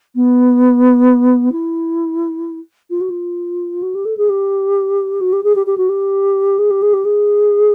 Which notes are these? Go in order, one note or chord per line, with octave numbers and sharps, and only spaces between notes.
B3
E4
F4
F#4
F4
F#4
G4
A4
G#4
G4
F#4
G4
G#4
G4
G4
F#4
G4
G#4
G4
G#4
G4
G#4